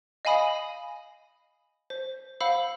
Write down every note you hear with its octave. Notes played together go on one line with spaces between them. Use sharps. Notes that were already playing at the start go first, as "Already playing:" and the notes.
D#5 F5 G#5 B5 D#6
C5
C5 F5 F#5 B5 E6